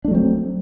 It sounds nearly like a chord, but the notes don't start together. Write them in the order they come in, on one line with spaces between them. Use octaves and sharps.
D4 A3 F#3 C4